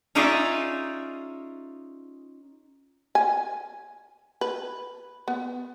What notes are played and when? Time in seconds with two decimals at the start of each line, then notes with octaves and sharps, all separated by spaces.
0.15 C#4 D#4 F4 G#4 D5 E5
3.15 G#5
4.41 B4
5.28 B3